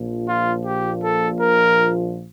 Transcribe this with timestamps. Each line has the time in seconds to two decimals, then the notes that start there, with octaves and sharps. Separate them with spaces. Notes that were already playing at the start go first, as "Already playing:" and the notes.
Already playing: A#1 A#2 F3
0.28 F4
0.65 G4
1.02 A4
1.40 A#4